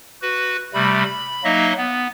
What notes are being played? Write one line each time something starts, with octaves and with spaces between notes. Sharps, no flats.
F#4 B4
C3 G3 A3 B5
B5
F#3 A#3 D#4 D#5 E5
B3